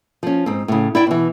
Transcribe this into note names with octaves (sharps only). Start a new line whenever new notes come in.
F3 C#4
G#2 C4
A2 C#3
E4 D5 G5
B2 E3